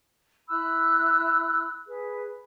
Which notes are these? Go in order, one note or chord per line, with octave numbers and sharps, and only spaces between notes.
E4 B5 E6 F#6
G#4 B4